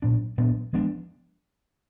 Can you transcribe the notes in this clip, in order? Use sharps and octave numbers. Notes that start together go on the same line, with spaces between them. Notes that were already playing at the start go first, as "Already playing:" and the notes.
A#2 F#3 B3 D4
A#2 F#3 B3 D4
F3 G#3 B3 D4